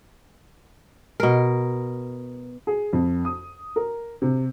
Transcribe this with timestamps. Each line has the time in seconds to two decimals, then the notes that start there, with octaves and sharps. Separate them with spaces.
1.20 B2 A#4
2.67 G#4
2.93 F2
3.25 D#6
3.76 A#4
4.22 C3